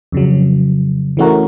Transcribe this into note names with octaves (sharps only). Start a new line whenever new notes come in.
F2 C#3 F#3
E3 A3 C#4 F#4 A#4